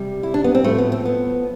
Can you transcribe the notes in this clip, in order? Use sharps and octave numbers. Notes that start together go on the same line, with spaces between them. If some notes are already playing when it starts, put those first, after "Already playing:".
Already playing: C3 G3
E4
D4
B3
C4
A2 F3 A3
B3
C4
B3